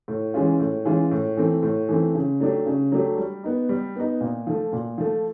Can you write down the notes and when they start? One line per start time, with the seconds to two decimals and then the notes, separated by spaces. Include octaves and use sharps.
0.08 A2
0.34 E3 G#3 C#4 F4
0.60 A2
0.85 E3 G#3 C#4 F4
1.11 A2
1.37 E3 A3 C4
1.63 A2
1.89 E3 A3 C4
2.15 C#3
2.40 F#3 A3 D4 G4
2.66 C#3
2.92 F#3 A3 D4 G4
3.18 G3
3.43 B3 D#4
3.69 G3
3.95 B3 D#4
4.21 A#2
4.47 F3 A3
4.73 A#2
4.98 F3 A3